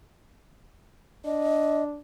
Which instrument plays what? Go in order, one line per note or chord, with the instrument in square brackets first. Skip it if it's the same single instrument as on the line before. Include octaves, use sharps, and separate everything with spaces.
[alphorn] D4 [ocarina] D#5